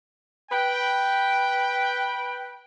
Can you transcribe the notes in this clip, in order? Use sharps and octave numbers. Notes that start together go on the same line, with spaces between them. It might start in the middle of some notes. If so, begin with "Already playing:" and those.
B4 G5